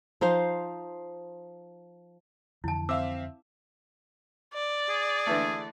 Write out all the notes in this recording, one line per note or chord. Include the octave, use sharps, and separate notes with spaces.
F3 D#4 C5 F5
F2 D3 E3 E4 A5
C4 E5 F5 D6 E6
D5
G#4
D3 E3 A3